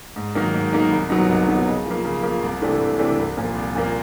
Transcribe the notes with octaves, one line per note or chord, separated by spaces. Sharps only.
G#2
D#3 F#3 A#3 D#4
G#2
D#3 F#3 A#3 D#4
C2
B2 F#3 B3 D#4
C2
B2 F#3 B3 D#4
C#3
F3 A#3
C#3
F3 A#3
C2
C3 E3 A3 D4
C2
C3 E3 A3 D4
C2
A#2 F3 A#3
C2
A#2 F3 A#3